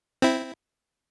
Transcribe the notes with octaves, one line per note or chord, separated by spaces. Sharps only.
C4 E4